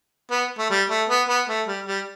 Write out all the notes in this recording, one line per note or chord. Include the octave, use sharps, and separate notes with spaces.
B3
A3
G3
A3
B3
B3
A3
G3
G3